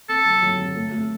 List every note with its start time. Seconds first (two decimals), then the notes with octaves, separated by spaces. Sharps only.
0.09 C4 A4
0.26 F#3
0.42 F#3
0.59 C4
0.76 A3
0.92 A3